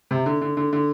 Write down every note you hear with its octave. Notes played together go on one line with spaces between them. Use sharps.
C3
D3
D3
D3
D3